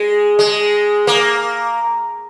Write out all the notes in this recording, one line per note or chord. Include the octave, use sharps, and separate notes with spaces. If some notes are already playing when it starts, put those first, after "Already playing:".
Already playing: G#3
G#3
A#3